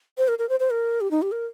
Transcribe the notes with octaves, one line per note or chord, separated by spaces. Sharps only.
C5
A#4
A#4
C5
C5
A#4
G4
D#4
G4
A#4